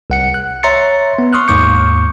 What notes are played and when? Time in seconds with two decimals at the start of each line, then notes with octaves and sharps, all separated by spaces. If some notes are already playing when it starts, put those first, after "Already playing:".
0.10 C2 F#5 C#7
0.34 F#6
0.63 C#5 E5 A#5 C6 A6 C#7
1.19 B3
1.33 C6 C#6 D#6 F6 F#6
1.48 D#2 G#2 C#6 D6 G6 C#7